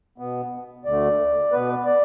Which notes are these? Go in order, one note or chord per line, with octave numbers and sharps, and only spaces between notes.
B2 B3
D2 D3 A3 D5
B2 B3 B4
D5